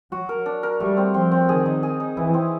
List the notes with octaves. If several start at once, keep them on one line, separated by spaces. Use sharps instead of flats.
F#3 F#4
A#4
D4
A#4
G3 A3
C4
F3 C4
C4
D#3 G#4
D#4
G#4
D#4
E3 E4
C4